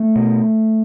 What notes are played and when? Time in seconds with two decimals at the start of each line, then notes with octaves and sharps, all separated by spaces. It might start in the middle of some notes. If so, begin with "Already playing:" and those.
Already playing: A3
0.16 B2